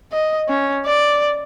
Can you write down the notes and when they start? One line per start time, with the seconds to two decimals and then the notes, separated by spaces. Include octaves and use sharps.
0.12 D#5
0.49 C#4
0.86 D5